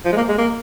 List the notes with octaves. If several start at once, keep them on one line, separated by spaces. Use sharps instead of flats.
F3
G#3
A#3
G#3
A#3